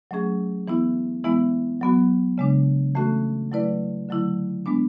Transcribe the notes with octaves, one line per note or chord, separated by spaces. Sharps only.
F#3 A3 C#4 G#4
E3 B3 E4
E3 G#3 B3 E4
F#3 B3 F#4
C#3 G#3 D4
E3 A3 C#4 F#4 A4
F#3 A3 E4 B4 D5
D3 F#3 A3 E4
G#3 B3 D4